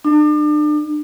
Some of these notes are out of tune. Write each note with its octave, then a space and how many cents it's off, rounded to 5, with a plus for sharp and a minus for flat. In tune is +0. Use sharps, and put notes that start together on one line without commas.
D4 +40